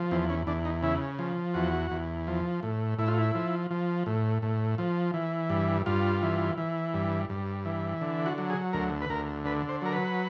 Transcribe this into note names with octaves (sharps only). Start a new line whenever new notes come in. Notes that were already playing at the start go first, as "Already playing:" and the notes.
Already playing: F3
E2 C4
C#4
E2 D4
D#4
C#3 E4
F3
E2 F#4
E2
F3
A2
A2 E4
F4
E4
F3
F3
A2
A2
F3
E3
G2
G2 F4
E3
E3
G2
G2
E3
D3
F#4
F#3
G#4
D2 A#4
B4
D2 A#4
D3 B4
C5
F#3 A#4
B4